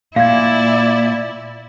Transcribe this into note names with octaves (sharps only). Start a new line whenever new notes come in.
A#2 E4 D5 F5 G#6